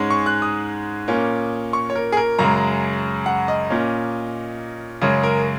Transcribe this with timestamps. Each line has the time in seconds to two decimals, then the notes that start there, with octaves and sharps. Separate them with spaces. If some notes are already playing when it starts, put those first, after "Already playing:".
Already playing: G#2 G#3 C#4
0.10 C#6
0.26 F#6
0.42 D#6
1.08 A#2 A#3 C#4
1.73 C#6
1.90 C#5
1.96 A#4
2.12 G#4
2.17 A#4
2.39 F#2 C#3 G#3 A#5
3.26 F#5
3.48 D#5
3.70 A#2 A#3 C#4
5.02 F#2 C#3 G#3 C#4 C#5
5.23 A#4